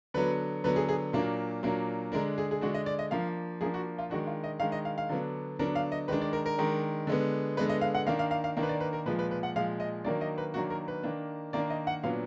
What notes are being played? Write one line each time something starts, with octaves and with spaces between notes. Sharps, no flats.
D3 F#3 B3 B4
D3 F#3 B3 B4
G#4
G#4
A#2 F#3 A#3 D4
A#2 F#3 A#3 D4
D3 G#3 D4 A#4
G#4
G#4
D3 G#3 D4 F#4
D#5
D5
D#5
F3 A#3 D4 F5
F3 A#3 D4 G#4
F#4
F4
D#3 G#3 D4 F#4
F4
D#5
D#3 G#3 D4 F5
D#5
F5
F5
D3 F#3 B3 D4
D3 F#3 B3 D4 A#4
F5
D#5
D#3 G#3 D4 B4
D5
A#4
A#4
D#3 G#3 D4
D3 G#3 B3
D3 G#3 B3 B4
D#5
F5
F#5
D#3 A#3 D4 F5
F5
F5
F5
D#3 A#3 D4
B4
D5
B4
A#4
A#2 F3 G#3 B4
B4
B4
F#5
A#2 F3 G#3 F5
D#5
D#3 F#3 A#3 D4 D5
D#5
B4
D#3 F#3 A#3 D4 F#4
A#4
B4
D#3 A#3 D4
D#3 A#3 D4 D5
D#5
F#5
A#2 F#3 B3 D4 F5